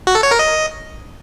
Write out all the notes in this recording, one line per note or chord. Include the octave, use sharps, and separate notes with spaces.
F#4
A4
C#5
A#4
D#5